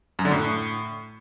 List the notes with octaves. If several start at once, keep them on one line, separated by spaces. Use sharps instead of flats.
F#2
D3
A2